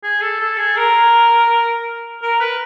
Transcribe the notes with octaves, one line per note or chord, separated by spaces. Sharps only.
G#4
A4
A4
G#4
A#4
A#4
B4